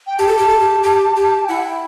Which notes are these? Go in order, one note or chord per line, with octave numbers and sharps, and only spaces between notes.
G5
G4 A5
A4
G4
A4
G4
G4
G4
G5
E4 F#5
G5